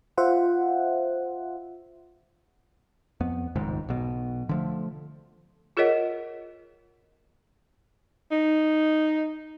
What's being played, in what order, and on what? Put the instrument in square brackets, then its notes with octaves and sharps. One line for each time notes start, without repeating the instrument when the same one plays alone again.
[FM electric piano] F4 C5 E5 F#5
[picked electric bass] F2 B3
F1 C#2 G#2 D#3
B1 B2
D3 F3 A3
[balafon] F4 G#4 A#4 C#5 D#5 F#5
[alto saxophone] D#4